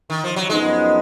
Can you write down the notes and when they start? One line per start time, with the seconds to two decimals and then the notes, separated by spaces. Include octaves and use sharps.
0.10 D#3
0.24 F3
0.36 F#3
0.50 F#2 F3 G#3 B3 D#4